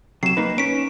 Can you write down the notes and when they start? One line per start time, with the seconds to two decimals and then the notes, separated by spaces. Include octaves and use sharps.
0.23 C3 F#3 C7 E7
0.37 A#3 D#4 B4
0.58 C#4 B6 D7